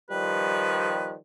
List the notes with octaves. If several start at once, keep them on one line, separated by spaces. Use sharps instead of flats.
D#3 F3 G3 B4